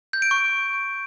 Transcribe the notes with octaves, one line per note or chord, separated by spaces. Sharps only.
G6
D7
C#6